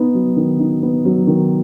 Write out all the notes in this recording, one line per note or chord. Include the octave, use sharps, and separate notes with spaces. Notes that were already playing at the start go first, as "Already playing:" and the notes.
Already playing: B3 D#4
F#3
D#3
D#4
B3
F#3
D#3